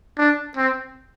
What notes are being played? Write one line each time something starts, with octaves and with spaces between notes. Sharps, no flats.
D4
C4